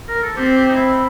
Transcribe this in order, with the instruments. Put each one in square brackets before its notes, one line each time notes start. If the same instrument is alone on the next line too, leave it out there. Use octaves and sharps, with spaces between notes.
[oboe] A#4
A4
[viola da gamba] C4 [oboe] G4
[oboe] G4
D#4
E4